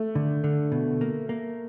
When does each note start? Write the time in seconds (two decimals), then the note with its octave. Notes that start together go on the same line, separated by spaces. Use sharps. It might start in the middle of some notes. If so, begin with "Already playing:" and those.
Already playing: A3
0.15 D3
0.44 D3
0.72 B2
1.01 A#3
1.29 A#3